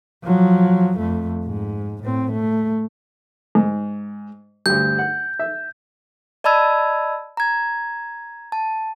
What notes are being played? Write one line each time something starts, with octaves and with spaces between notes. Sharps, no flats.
F3 F#3
F2 A3
G#2
A2 C4
A3
G#2
D2 G2 G6
F#5
E5
D5 D#5 A5 B5 E6 G#6
A#5 G#6
A5